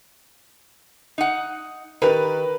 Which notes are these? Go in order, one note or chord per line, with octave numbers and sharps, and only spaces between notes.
D#4 F#5
D#3 G4 A#4 B4